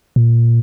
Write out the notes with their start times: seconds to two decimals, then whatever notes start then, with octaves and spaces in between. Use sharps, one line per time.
0.16 A#2